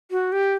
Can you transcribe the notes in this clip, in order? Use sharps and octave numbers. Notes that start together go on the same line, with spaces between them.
F#4
G4